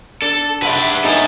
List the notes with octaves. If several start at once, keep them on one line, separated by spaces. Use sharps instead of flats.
D4 A4
B4 D5 E5 F#5 C6
D#4 A4 B4 C#5 G#5